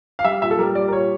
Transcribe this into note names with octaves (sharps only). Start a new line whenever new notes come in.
F5
G3 E5
A#2 E5
A4
G3 A#4
G3 D5
A#4
A#2 C#5